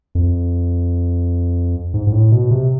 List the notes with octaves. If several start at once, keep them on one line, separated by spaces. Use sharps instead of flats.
F2
G#2
G#2
A2
B2
C3